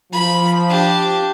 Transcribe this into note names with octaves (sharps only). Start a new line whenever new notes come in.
F3 B5
D4 G4